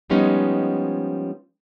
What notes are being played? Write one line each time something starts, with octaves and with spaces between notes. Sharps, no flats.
F3 G3 G#3 B3 C#4 D#4